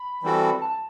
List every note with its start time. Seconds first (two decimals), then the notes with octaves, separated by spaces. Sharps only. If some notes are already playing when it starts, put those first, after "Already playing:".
Already playing: B5
0.23 E3 G3 C4 F#4 A4
0.62 A5